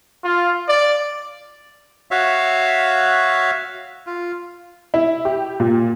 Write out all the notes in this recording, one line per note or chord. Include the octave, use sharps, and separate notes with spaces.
F4
D5
F#4 C#5 E5 F5
F4
E4
G4
A#2